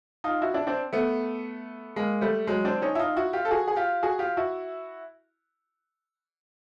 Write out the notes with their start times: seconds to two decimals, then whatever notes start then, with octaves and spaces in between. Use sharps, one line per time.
0.24 D#4 F4
0.42 E4 F#4
0.54 D4 E4
0.67 C4 D4
0.93 A3 B3
1.96 G#3 A#3
2.21 G3 A3
2.47 F#3 G#3
2.65 C4 D4
2.82 C#4 D#4
2.95 E4
2.99 D#4 F4
3.16 E4 F#4
3.33 F4 G4
3.45 A4
3.51 F#4 G#4
3.68 G#4
3.76 F4 G4
4.03 F#4 G#4
4.19 F4 G4
4.37 E4 F#4